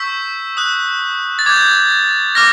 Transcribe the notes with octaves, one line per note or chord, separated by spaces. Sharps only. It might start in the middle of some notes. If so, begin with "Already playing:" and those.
Already playing: C#6 E6 G6 B6
D#6 F#6
A6
D6 G6 G#6
D6 F6 A#6